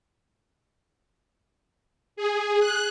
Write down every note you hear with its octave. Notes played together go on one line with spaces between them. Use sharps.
G#4
F#6